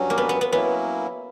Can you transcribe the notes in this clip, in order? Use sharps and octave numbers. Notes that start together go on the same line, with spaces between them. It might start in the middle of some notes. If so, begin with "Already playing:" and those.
Already playing: G2 F#3 C#4
A#3
B3
B3
B3
F#3 A#3 B3 C#4 E4